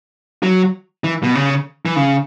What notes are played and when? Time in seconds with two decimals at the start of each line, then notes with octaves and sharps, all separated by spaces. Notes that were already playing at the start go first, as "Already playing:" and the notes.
0.43 F#3
1.04 E3
1.23 B2
1.35 C#3
1.85 E3
1.96 C#3